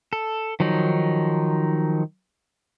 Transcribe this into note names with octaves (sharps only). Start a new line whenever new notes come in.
A4
D#3 F3 F#3 D#4